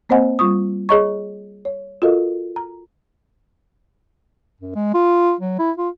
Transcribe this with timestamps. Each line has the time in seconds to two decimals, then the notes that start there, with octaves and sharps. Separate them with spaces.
0.09 A#3 C4 C5 D#5 F#5 G#5
0.39 G3 F4 C#6 D#6
0.89 G#4 C#5 D#5 A#5 C#6
1.65 C#5
2.02 F4 F#4 A4 A#4 D#5 F5
2.56 A#5
4.61 F#2
4.75 G#3
4.94 F4
5.41 F#3
5.59 E4
5.78 F4